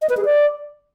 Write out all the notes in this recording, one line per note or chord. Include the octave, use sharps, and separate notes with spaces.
D#5
B4
G#4
D5